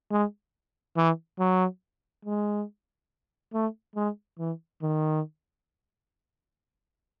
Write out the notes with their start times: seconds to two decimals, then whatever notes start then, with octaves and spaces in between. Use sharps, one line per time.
0.11 G#3
0.97 E3
1.39 F#3
2.25 G#3
3.54 A3
3.96 G#3
4.39 E3
4.82 D#3